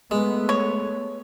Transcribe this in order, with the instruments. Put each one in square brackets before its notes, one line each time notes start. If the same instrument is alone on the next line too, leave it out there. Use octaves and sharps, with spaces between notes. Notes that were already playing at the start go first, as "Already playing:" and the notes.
[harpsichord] G#3 [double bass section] A3 B3
[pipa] C#5